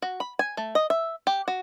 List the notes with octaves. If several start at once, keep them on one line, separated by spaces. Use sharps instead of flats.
F#4
B5
G#5
A3
D#5
E5
G4
F#4